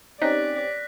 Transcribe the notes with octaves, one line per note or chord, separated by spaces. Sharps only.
C4 C#4 D#4 G4 D5 F#6 A#6 B6